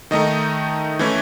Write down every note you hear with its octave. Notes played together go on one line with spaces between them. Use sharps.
D#3 A3 D#4 D#5
E3 A3 C#4 E4